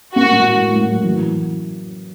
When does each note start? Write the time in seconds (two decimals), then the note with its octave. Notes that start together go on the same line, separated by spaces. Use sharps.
0.16 A#3 F#4
0.31 A2
0.46 A2
0.60 A2
0.75 A2
0.90 F#3
1.04 E3